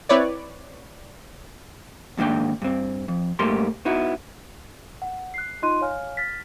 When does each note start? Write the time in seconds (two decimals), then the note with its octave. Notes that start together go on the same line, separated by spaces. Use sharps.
0.09 C4 E4 B4 C#5 D5
2.17 D#2 G#2 D#3 A#3 D4 G5
2.62 G2 C4
3.08 F2
3.39 G#2 G3 A3 A#3 G4 C6
3.85 B3 D#4 E4 F#4
5.02 F#5
5.34 F#6 C7
5.62 D#4 F4 D#5 C6 F#6 D#7
5.81 C#5 F5 G#5 F6
6.17 F6 A6 B6